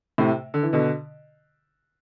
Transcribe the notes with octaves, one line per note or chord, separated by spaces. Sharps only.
A2 C3
D3
E3
B2 D3